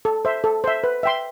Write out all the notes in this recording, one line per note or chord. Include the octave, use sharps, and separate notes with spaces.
A4
C5 E5
A4
C5 E5
B4
E5 G5 C6